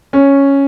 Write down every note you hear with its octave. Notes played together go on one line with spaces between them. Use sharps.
C#4